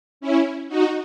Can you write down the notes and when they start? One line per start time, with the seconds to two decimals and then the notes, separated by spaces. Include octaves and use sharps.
0.21 C#4 E4
0.68 D#4 F#4